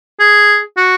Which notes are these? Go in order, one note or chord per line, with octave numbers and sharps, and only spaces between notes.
G#4
F#4